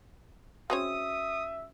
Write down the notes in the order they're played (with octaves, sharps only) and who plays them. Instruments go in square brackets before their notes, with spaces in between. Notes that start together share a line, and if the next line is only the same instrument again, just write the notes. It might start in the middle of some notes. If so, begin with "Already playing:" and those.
[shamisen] G#3 C4 C#5 [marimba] C#4 F#4 [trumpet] E5 [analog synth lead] D#6